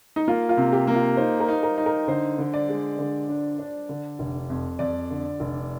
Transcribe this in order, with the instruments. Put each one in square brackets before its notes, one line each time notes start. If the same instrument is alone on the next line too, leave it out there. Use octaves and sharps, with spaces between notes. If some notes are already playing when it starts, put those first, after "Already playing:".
[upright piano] D#4
[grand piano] A#3 [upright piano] F4
[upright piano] F4
[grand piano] C3
[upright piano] G4
[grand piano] A#3
[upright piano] F4
[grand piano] D#4 [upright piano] C5
[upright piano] A#4
[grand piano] D#4
[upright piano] A#4
[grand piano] D#4
[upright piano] A#4
[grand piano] D3 [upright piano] C5
[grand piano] D3
[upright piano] D5
[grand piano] G#3
D3
D4
D4
D3
F1
F2
[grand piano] F2 [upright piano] D5
[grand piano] D3
F1